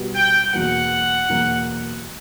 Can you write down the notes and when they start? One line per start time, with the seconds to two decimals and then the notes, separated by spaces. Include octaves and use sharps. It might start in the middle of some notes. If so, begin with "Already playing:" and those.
Already playing: B2 G3 B3 F#4
0.15 G5
0.53 E2 B2 F#3 A#3 F#5
1.29 E2 B2 F#3 A#3